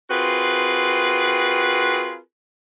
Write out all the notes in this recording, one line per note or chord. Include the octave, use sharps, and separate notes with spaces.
C4 F4 F#4 G#4 A#4 B4